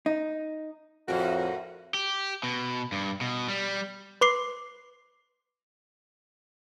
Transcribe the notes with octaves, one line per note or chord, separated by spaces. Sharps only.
D#4
F2 A2 F#4 A#4
G4
B2
G2
B2
G3
B4 C6 D6 C7